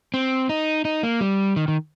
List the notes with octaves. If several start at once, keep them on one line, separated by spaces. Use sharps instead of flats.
C4
D#4
D#4
A#3
G3
D#3
D#3